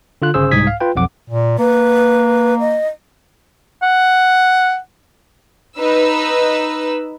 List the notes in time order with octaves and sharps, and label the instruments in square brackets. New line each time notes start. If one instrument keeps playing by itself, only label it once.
[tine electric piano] D3 F4 F#6
G1 C#3 G#4 C5 E6
C2 G#2 D#6 G#6 B6
F5
F4 B4 G5
B1 F2 F#5 D6
[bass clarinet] A#2
[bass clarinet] A#3 [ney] B4
[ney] D#5
[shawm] F#5
[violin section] D#4 B4 E6